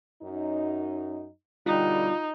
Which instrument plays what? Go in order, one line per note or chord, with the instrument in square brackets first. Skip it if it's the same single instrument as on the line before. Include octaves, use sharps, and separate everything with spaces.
[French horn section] F#2 D#4
[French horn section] B2 D3 G3 [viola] D#4 [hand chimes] F4